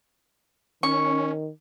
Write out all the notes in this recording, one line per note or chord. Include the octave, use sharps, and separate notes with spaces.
D#3 C#4 C#6